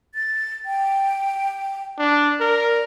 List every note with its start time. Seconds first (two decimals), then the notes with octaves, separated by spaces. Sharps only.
0.15 A6
0.66 G5
1.99 D4
2.40 A#4 D5